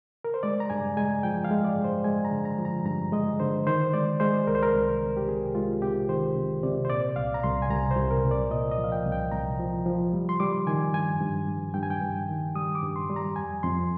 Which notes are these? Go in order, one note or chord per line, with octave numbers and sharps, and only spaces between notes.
A#4
C5
G#3 D5
A#5
G2 G#5
G#3 G#5
F3 G5
F5
G#3
D5
G2
C5
G#3 G#5
A#5
D3
A#5
F3
A#5
G2 A#5
G#3 D#5
D3 C5
D#3 C5
G#3 D5
G#3 C5
C2 A#4
C5
A#4
C2
C2
G4
C3 G#4
G#3 F4
C3 G4
D#3 C5
C3
C3 D5
C5
A#2 D5
C2 F5
A#5
C2 C6
G#5
C2 A#5
C5
C2
A#4
C2
D5
A#2 D#5
D#5
F3
F5
G5
C2
G5
C2 A#5
F3
F3
G3
C6
G3 D6
D#3 G#5
G2 G#5
G2
G2
G2 G5
G#5
G5
G2
D#3
G3 D#6
D6
G2
C6
G3
A#5
F2 G#5
F2 C6